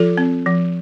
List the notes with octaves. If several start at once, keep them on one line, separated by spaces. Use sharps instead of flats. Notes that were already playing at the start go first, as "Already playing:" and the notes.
Already playing: F3 F4 A4
C4
F3